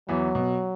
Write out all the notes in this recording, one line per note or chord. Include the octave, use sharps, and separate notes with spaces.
E2 E3 F#3
B2